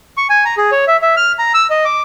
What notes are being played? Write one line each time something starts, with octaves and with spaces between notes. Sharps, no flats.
C#6
G#5
A#5
G#4
C#5
E5
E5
F6
A#5
E6
D#5
D6